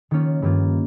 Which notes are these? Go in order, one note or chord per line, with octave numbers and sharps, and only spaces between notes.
D#3 A#3 C#4 F4
G2 D#3 A#3 F4